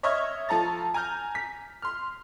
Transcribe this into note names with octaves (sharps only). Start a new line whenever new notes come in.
C#5 D#5 E5 C#6 F6 G#6
F3 A4 A#5 A6
G#5 A#5 F6 G6
B6
C6 F6